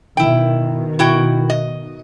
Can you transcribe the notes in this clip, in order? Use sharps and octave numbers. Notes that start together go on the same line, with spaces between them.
B2 D#3 E4 G5
E4 F#4 G5
D#5